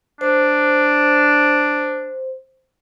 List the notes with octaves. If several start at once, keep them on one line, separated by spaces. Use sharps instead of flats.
D4 C5